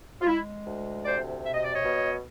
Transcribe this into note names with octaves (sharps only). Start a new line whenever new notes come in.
F4
G#3 E4
D2
C3 C5 D5
B2 E5
D#5
D5
C#5 D#5
B2